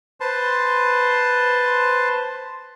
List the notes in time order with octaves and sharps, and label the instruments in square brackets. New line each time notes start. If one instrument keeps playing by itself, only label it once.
[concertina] B4 C5 A5 C6